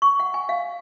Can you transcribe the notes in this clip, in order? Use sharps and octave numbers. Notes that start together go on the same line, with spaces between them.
C#6
F#5
G#5
F5